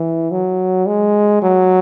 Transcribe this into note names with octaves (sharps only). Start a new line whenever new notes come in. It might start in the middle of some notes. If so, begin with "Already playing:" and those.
Already playing: E3
F#3
G#3
F#3